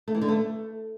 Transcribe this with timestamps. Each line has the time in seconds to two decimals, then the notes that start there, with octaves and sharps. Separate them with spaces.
0.08 A3
0.14 E3
0.21 D3
0.28 A3